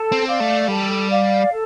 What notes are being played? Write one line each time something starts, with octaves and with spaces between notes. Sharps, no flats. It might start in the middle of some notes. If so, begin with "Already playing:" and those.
Already playing: A4
C4
D5 F5
A3
G3 A4
D5 F5
A4